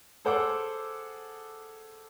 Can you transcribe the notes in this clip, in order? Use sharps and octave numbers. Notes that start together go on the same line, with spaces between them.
G#4 A4 C5 F#5 D6 E6